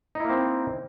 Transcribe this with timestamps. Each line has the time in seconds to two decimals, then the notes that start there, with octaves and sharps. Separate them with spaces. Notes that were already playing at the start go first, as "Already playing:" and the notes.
0.15 D#4
0.20 E4
0.25 A#3
0.30 C4